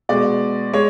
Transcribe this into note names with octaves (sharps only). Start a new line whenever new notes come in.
B2 G#3 D5
G#3 C#5